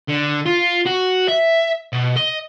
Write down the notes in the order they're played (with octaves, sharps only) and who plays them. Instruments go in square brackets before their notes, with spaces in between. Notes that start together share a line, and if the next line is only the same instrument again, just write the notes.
[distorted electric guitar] D3
F4
F#4
E5
B2
D#5